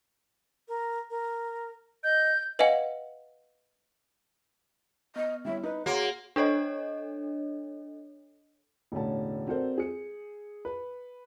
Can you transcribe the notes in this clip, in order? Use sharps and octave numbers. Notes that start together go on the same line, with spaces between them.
A#4
A#4
D#5 G6
B4 D#5 F5 F#5 G#5
B3 D#5
G3 E4 C#5 E5
D#4 B4
A#3 F#4 G#4 C#5 F#5 C6 D7
D4 A4 C#5 D#5
E1 A2 D3 A3 C#4 A5
C4 F#4 A4 A#4 C5 D5
G#4 C#7
B4